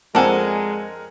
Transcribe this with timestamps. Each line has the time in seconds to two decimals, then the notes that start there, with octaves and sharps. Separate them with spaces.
0.15 F2 G#3 C4 D4 A4 A#4 F#5 G#5